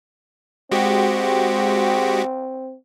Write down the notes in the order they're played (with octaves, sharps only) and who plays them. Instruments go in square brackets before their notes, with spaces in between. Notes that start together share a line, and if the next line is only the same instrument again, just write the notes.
[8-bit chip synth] G#3 F#4 G4 [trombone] C4